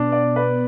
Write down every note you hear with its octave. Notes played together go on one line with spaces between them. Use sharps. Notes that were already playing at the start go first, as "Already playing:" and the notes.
Already playing: B2 B3 D4
D5
B4